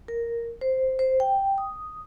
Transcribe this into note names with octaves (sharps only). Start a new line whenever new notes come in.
A#4
C5
C5
G5
D#6